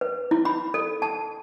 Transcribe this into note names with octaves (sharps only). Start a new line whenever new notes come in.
B4
E4
B5
A4
A5